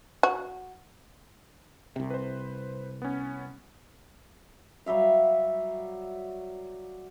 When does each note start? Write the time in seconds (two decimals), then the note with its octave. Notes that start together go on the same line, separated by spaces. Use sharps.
0.23 F#4
1.96 C2 C3
2.10 B4 C5
3.02 B3 C#4
4.86 F#3 G3 E5 F5